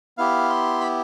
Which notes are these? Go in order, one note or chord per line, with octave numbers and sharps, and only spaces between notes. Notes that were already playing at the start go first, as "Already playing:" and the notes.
B3 E4 G4 F5
C6
B5